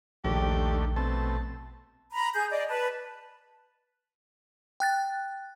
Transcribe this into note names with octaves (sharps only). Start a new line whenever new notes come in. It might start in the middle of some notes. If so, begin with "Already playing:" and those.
A#1 D#2 D3 A3 G4
B2 A3 C4 A5
A#5 B5
G#4 G6
D5 D#5
B4 A5
G5 F#6 A6